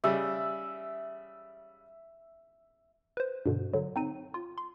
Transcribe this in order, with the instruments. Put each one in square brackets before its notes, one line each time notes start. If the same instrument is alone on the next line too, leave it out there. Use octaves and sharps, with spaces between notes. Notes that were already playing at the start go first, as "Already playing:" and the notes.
[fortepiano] C#3 G3 [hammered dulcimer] E5
[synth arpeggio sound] B4 C5
G2 B2 D3
D3 F#3
C4 D#4 D#7
F4
C6